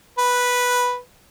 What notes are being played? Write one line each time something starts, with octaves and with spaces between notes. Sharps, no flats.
B4